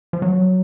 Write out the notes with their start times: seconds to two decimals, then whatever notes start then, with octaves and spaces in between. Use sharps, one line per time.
0.13 F3
0.22 F#3